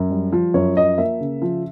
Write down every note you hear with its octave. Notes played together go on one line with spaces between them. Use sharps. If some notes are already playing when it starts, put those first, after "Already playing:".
Already playing: F#2
G3
F3
F#2 C#5
F3 D#5
A#3 E5
C#3
F3